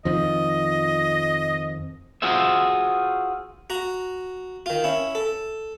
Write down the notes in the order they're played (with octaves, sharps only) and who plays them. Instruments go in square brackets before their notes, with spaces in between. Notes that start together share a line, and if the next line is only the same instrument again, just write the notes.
[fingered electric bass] F2 D#3 F3 [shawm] D#5
[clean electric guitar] F4 F#4 G#4 C5 E5
[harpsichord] F#4 A#5
D#3 F4
C#4 E4
A4